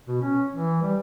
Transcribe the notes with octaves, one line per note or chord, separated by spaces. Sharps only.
B2
C#4
E3
G3